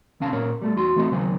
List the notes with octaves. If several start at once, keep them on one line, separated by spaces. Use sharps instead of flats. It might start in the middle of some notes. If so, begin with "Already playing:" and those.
D#2 C3 C#4 F5 A5
A#2 A#3 C#4 A#4 C#5
G3 A3 A4
E2 F#4 C6
E3 A3 C4 F#4 A4 D#5
D#2 C#3 F#3 C5 G#5